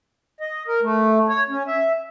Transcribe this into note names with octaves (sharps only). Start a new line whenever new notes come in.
D#5
A#4
A3
C#5
C#4
E5